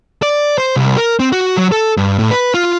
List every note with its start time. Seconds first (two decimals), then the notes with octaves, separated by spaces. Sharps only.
0.22 D5
0.58 C5
0.76 C2
0.97 A#4
1.20 C4
1.32 F#4
1.57 F#3
1.72 A4
1.97 G2
2.19 A2
2.31 B4
2.54 F4